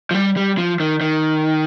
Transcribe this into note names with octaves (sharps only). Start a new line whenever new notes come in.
F3
G3
G3
F3
D#3
D#3